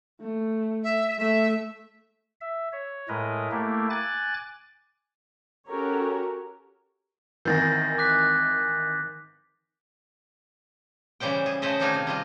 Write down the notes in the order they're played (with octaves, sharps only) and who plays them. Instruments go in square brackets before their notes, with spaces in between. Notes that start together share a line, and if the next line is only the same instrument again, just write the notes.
[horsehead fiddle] A3
[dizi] E5
[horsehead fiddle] A3 [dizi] E5
[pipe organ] E5
C#5
A2 G#3 A#4 B4 D#5
A3 A#3 E4 G4
G#5 D6 F#6 A6
[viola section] C#4 F#4 G4 A4 A#4 C#5
[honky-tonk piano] G#1 D#3 E3 [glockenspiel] G6 A6 A#6
[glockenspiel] D6 F#6 B6
[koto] C#3 E3 G3 C5 G5
G#4
C#3 A3 C5 D#5 E5
D#3 C4 D4 D#4 F4 G#4
C3
G3 F4 D#5